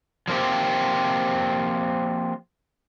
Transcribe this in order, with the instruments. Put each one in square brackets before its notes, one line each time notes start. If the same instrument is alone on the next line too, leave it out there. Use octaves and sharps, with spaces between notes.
[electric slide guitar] F3 A#3 C4 G4